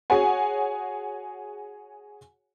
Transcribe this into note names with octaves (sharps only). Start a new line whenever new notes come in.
F#4 G#4 C#5 F#5 G#5